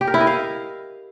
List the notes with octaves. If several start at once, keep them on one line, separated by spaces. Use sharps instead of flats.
G4
A#4
E4
D#5
F5